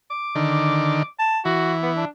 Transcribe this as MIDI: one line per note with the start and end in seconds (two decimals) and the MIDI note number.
0.10 1.06 86
0.35 1.03 50
0.35 1.03 51
1.19 1.39 81
1.45 2.05 52
1.45 1.74 66
1.82 1.91 59
1.97 2.08 62